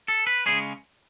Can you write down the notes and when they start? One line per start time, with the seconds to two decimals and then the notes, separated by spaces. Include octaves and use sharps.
0.08 A4
0.27 B4
0.46 C#3 G#3 C#4 G#4